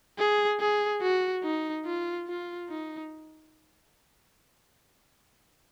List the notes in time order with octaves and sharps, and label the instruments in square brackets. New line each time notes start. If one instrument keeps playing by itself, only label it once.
[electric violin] G#4
G#4
F#4
D#4
F4
F4
D#4